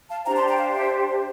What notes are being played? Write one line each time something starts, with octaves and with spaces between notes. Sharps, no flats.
F5 A5
D4 G4 C5 G5 A#5
A5 C6
G5 A#5
F5 A5
E5 G5